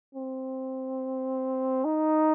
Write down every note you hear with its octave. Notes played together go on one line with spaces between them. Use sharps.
C4
D#4